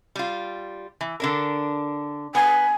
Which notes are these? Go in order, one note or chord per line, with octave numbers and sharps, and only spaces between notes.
G3 F4
E3
D3 D4 A#4
B3 G#5